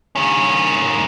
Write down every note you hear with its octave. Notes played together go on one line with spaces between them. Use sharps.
D#3 C#4